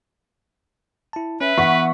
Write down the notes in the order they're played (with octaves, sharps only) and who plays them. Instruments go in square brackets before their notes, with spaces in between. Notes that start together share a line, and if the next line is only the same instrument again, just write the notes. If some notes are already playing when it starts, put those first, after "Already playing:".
[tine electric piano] E4 A5
[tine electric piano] C#4 [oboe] B4 [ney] E5
[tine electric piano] E3 B3 B6 [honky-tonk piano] F#5 C#6